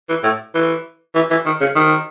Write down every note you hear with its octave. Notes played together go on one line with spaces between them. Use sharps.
E3
A2
E3
E3
E3
D#3
C#3
D#3